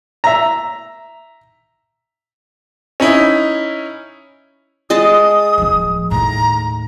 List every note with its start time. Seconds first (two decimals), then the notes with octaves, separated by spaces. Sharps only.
0.24 E5 A#5
3.00 C#4 D#4 E4
4.90 G#3 D#5 A5 D#6
5.58 D1 F3
6.11 D#2 A2 A#5